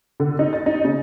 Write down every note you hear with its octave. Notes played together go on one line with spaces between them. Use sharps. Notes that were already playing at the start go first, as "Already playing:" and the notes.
D3
D#4
A6
D#4
C#3